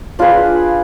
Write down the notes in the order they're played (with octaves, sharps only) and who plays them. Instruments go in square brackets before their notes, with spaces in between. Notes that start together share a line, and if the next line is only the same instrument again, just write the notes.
[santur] D4 F4 G#4 B4